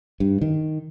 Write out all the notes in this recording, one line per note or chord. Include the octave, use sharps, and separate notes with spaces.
G2
D#3